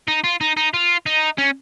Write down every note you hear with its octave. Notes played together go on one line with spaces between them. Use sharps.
D#4
F4
D#4
D#4
F4
D#4
C#4